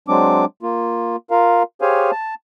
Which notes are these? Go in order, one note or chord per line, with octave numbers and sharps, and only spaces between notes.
F#3 G#3 C4 D4 D6
A#3 F4
F4 A#4 F5
G4 G#4 C5 C#5 F5 G#5
A5